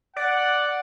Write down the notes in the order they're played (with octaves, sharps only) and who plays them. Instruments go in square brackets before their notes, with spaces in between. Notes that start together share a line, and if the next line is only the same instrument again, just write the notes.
[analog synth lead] D5 [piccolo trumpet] F#5